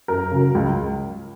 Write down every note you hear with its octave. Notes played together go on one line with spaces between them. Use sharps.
F#2 A#4
C#3 F#3
C#2